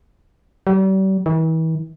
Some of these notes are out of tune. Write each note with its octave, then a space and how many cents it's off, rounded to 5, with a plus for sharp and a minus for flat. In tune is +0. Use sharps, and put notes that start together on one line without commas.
G3 -40
E3 -40